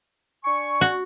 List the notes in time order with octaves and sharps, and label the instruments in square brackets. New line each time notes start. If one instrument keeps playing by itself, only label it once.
[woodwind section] D4 G#5 C#6
[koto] F#4